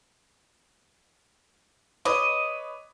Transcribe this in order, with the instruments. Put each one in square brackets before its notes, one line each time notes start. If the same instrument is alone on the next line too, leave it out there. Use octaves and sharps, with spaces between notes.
[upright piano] B4 C#5 D6 [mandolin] D#5